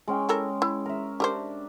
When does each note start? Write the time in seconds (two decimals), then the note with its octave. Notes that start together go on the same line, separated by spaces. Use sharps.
0.08 G#3 C#4 G5
0.29 E4 A4 A#4
0.62 E4
0.86 A#4 E5
1.20 D4 G4 A#4 C5